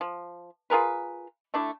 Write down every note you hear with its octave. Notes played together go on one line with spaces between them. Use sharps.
F3
F4 G#4 A#4 B4
A3 D4 E4